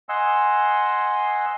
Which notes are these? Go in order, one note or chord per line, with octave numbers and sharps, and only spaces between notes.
D#5 F#5 G#5 C6 E6